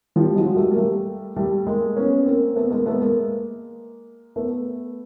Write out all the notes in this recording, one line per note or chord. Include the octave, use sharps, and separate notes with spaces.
F3 G3
F#3 G#3
G3 A3
A#3
G3 A3
G3 A3
G#3 A#3
B3 C#4
A#3 C4
A3 B3
G#3 A#3
A3 B3
G#3 A#3
A3 B3